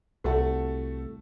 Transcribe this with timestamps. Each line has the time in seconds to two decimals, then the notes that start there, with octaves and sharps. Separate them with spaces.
0.24 C2 A3 F#4 A4